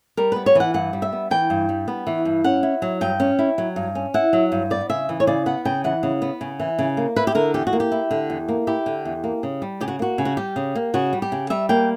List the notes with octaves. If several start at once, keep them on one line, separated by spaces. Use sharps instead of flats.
G3 A#4
B3 B4
C#5
E3 F#5
G2 F#5
G3
E5
B3
E3 G5
G2
G3
B3
E3
G2
C#4 F#5
E4
F#3
G2 G5
C#4
E4
F#3
G2
C#4
E4 F#5
F#3
G2
B3 D5
C#3 E5
E3
C#5
C#3 D5
B3 F#5
C#3 G5
E3 F#5
C#3
B3
C#3
E3
C#3
A#3
E4 B4
G4
D3 A#4
E2 G4
F#4
A#3
G4
E4
D3
E2
A#3
E4 G4
D3
E2
A#3
C#3
G3
C#3 G4
F#4
A#3 F#4
C#3
F#4
G3 G4
C#3
A#3
C#3 F#4
G3
G4
C#3
G3 E5
A#3 G5